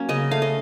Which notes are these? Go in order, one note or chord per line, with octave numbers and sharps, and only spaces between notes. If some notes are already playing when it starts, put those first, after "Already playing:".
Already playing: F#3 A#3 C#4
C#3 D#5
A3 F5
D#5